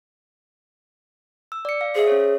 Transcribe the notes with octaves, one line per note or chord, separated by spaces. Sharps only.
E6
D5 C#7
F5
G#4 C5 E5
C#4 C#5